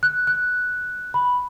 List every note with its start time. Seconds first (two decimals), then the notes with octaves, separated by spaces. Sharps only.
0.03 F#6
0.27 F#6
1.14 B5